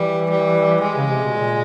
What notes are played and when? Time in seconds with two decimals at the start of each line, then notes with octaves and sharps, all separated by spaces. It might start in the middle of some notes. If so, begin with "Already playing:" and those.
Already playing: E3 G3
0.30 G3
0.84 G#3
0.96 C#3
1.10 C3
1.23 B2
1.36 A#2